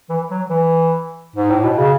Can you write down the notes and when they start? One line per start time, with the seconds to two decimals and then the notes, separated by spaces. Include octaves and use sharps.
0.10 E3
0.31 F#3
0.50 E3
1.36 G#2
1.51 A2
1.64 B2
1.78 C#3